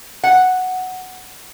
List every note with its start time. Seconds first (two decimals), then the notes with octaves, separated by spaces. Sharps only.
0.24 F#5